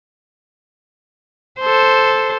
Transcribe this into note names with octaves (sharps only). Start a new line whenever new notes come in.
A4 C5